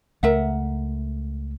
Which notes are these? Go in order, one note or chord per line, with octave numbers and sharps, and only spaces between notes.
C#2 A3 A#4 E5 F#5